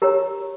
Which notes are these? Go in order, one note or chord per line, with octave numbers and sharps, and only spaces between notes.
G4 A#4 C#5 A#5